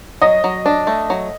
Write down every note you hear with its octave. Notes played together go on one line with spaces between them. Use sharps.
F#3 D#5
F#3
D4
A3
F#3